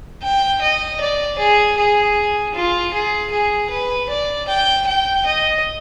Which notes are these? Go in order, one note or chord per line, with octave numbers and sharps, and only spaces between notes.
G5
D#5
D5
G#4
G#4
F4
G#4
G#4
B4
D5
G5
G5
D#5